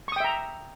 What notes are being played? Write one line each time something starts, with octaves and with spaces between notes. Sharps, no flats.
E5 G5 A#5 C#6 D#6